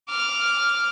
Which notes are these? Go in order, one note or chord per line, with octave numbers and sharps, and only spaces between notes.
D6 F6